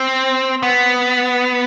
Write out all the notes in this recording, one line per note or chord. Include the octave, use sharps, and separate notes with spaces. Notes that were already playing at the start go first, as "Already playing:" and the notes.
Already playing: C4
B3